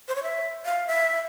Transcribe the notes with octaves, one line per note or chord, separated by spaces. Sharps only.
C5
C#5
E5
F5
E5